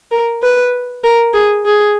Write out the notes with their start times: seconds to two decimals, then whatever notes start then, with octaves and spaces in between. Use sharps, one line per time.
0.11 A#4
0.43 B4
1.04 A#4
1.33 G#4
1.65 G#4